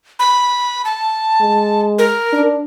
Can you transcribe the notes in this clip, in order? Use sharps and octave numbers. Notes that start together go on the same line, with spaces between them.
B5
A5
G#3
A#4
D4